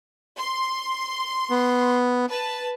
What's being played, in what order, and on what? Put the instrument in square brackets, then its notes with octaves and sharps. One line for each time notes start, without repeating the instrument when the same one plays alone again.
[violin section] C6
[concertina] B3
[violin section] B4 A5